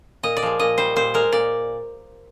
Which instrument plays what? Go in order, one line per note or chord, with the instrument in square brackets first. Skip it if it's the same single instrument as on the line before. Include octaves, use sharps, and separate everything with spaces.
[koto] A#2 D#5
D5
F3 G#3
A#2 D#5
G3 C5
A#2 C5
G#3 A#4
A#2 D5